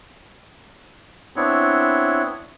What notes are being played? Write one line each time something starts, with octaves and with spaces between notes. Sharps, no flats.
B3 C4 D4 E4 C#5